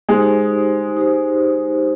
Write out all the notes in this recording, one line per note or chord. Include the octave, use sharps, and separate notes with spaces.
G#3 D#4 G4 C5
D#4 G4 C5